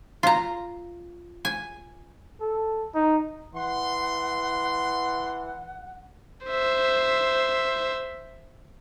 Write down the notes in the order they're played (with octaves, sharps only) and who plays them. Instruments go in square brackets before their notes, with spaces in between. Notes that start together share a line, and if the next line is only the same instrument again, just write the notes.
[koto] F4 A#5
G#5
[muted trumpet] A4
D#4
[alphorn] E3 [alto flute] F#5 [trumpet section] C6
[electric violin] C5 E5